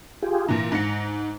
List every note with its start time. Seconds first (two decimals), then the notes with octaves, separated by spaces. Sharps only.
0.23 F4 G4 G#4
0.48 A#2 E3 A#5
0.72 G#2 C#7